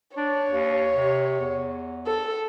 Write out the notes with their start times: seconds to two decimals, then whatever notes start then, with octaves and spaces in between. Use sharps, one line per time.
0.17 D4 C#5
0.51 D#2
0.96 C3
1.41 E2
2.07 A4